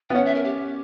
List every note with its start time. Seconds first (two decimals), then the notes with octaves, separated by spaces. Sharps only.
0.10 B3 G5
0.15 C#4 F#5
0.26 E5
0.35 A#4
0.44 G4